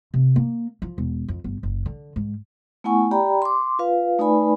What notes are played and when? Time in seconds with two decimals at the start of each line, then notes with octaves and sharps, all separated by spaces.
0.14 C3
0.36 A#3
0.82 F3
0.98 E1
1.28 F2
1.44 G1
1.63 F#1
1.86 D3
2.16 G#2
2.84 A3 B3 E4 F#5 G#5 C#6
3.11 G4 D5 G5 A#5 B5
3.42 C6 D6
3.79 F4 B4 F5
4.19 A3 D#4 B4 D5 G#5 B5